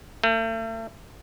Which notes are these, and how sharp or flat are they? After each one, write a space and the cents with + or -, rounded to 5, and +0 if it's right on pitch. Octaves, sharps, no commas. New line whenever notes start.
A3 +40